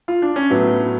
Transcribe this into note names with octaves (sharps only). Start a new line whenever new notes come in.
F4
D4
C#4
A2 F#3 A3 B3